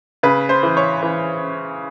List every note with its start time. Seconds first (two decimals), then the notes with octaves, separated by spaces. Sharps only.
0.23 C#3 B4
0.49 C5
0.63 E3
0.77 C#5
1.03 E3